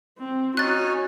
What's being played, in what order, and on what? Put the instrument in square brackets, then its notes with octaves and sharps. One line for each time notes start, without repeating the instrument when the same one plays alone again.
[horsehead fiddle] C4
[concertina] C#4 D#4 G#5 [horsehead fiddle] F#4 C#5 [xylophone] F#6 A6